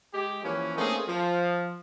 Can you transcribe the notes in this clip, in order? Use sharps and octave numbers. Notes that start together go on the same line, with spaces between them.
G#3 G4
E3 F3 A#3 C#4
A3 A#3 C4 C#4 D#4 G#4
F3